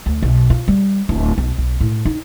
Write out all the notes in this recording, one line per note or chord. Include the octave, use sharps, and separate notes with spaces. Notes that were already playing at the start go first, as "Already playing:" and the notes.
D2
B1
F4
G3
D1
B1
B1
A2
D#4